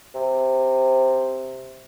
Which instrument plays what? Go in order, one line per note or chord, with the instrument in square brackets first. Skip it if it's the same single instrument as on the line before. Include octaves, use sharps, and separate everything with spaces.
[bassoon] C3